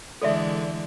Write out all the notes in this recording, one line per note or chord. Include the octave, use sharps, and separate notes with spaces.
D3 E3 G#3 A4 D5 E5